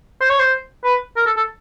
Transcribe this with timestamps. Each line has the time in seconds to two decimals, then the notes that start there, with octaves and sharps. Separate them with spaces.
0.21 C5
0.30 C#5
0.40 C5
0.84 B4
1.17 A#4
1.26 A4
1.37 A4